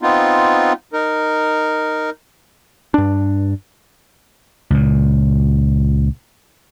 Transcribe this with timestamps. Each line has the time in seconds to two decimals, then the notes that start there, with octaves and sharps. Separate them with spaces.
0.02 B3 C4 D#4 F4
0.93 D#4 A#4
2.94 G2 D4
4.70 C#2 A#2